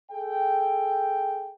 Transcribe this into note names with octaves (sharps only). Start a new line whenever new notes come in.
G#4 A4 G5